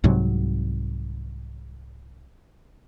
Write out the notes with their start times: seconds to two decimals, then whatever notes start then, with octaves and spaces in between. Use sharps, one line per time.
0.04 C2 G#2 C3 F#3